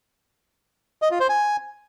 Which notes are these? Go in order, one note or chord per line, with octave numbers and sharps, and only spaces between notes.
D#5
F4
C5
G#5